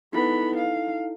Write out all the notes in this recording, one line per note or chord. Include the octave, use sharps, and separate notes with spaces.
B3 D#4 E4 A4 B5
F5